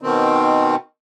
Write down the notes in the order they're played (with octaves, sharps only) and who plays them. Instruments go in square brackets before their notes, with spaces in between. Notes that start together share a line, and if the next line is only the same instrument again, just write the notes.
[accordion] B2 D#3 C4